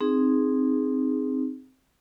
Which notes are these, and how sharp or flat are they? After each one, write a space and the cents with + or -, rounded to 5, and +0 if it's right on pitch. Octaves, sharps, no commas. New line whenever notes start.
C4 +0 D#4 -10 G#4 +0